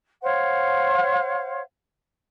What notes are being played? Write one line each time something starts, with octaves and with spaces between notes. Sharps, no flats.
C5 C#5 F5 F#5